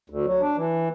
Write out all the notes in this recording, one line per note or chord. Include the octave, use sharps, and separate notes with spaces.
D2
F#3
D4
E3